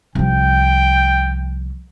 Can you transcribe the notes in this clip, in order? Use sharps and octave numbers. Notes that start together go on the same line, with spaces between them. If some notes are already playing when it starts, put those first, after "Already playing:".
C2 F3 G5